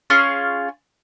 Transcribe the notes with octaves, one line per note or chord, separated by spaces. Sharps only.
C#4 F4 G#4